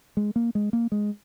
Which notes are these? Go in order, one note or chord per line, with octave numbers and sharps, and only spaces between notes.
G#3
A#3
G#3
A#3
G#3